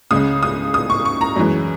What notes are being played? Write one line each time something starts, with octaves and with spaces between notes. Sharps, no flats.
C#2 C#3 G#3 D#6
D#6
D#6
C#6
C#6
A#5
F#2 E3 G#3